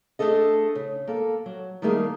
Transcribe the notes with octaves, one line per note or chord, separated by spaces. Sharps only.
A3 D4 G#4 A4 D#5
C#3
A#3 A4
F#3
D#3 G3 A3 A#3 G#4